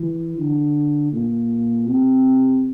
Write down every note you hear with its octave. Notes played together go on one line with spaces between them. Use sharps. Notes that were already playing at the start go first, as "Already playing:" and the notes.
Already playing: E3
D3
A#2
C3